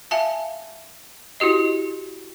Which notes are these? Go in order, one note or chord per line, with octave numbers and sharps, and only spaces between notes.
E5 F5 G#5 A5
E4 F#4 G4 D#5